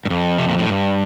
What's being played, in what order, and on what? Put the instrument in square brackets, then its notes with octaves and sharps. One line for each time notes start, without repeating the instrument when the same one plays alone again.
[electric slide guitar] G2
F2
C3
A#2
A2
G2